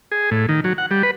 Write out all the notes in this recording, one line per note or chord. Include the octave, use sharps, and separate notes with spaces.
G#4
A2
D#3
F#3
F#5
G3
B4